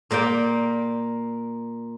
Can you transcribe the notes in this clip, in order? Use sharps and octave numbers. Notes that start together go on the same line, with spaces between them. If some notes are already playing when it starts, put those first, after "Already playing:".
A#2 A#3 D5 G5